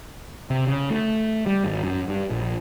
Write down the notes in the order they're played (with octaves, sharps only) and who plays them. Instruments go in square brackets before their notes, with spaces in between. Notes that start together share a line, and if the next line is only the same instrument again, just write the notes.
[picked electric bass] C3
C#3
A3
G3
G#1
F#2
G2
A#1